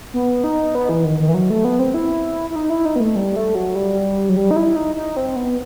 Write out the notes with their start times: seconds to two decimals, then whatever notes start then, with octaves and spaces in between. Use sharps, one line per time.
0.14 B3
0.44 D#4
0.75 B3
0.89 E3
1.05 D#3
1.20 D#3
1.29 E3
1.34 F#3
1.50 A3
1.65 B3
1.79 C4
1.94 E4
2.50 E4
2.56 D#4
2.70 E4
2.85 D#4
2.96 B3
3.00 A3
3.16 G3
3.36 A3
3.55 F#3
3.75 G3
4.29 F#3
4.37 G3
4.51 D#4
4.56 E4
4.76 D#4
4.96 D#4
5.17 C4
5.36 B3